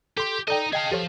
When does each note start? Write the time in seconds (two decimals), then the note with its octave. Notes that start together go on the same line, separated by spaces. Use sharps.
0.17 G4 A4 C6
0.48 D#4 A4 D5 D#5 G5
0.73 G#4 D#5 F5 G5 A5
0.92 F3 G4 A4 C#5